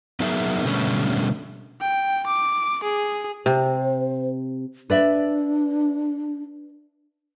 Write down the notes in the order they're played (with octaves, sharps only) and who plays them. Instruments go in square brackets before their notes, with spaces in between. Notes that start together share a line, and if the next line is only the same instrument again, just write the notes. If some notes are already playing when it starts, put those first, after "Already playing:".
[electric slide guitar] F#3 B3 D#4 G#4 A#4 E5
B2 D3 G3 A3 B3 C#4
[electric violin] G5
D6
G#4
[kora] C3 [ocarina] C5
[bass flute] D4 [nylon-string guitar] B4 D5 E5